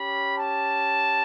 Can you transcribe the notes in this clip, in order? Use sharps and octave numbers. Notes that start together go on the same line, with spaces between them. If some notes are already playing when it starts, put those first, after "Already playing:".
Already playing: C#4 G4 B5
A5